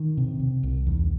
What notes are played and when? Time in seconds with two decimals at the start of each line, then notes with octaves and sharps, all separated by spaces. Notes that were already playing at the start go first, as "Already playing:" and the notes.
Already playing: D#3
0.17 C3
0.40 C3
0.63 C2
0.87 E2